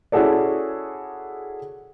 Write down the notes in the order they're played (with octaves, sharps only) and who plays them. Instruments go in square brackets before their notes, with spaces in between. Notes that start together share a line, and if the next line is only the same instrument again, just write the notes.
[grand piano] C#4 E4 F#4 G#4 A4 D5